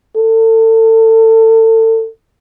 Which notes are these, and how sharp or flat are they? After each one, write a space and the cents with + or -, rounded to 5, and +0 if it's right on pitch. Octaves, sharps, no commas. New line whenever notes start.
A4 +30